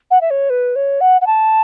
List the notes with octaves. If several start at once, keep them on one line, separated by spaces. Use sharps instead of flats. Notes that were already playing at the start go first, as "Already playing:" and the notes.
F#5
E5
C#5
B4
C#5
F#5
F#5
A5